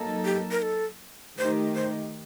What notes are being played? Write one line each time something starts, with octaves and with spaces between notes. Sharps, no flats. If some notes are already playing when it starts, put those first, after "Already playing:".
Already playing: F#3 A#3 D#4 A4
G4
A#4
A4
D#3 A3 D#4 G4 C5
C5